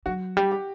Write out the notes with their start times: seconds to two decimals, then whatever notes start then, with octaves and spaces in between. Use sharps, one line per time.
0.06 F#3 F#4
0.37 G3 G4
0.52 G4